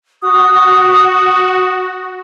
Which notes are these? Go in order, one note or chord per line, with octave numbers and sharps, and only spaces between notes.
F#4 D#6